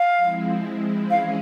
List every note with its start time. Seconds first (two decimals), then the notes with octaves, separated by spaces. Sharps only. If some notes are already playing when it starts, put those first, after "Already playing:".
Already playing: F5
0.17 F3 G#3 C4 E4
1.10 E3 G#3 C#4 E4 G#4 F5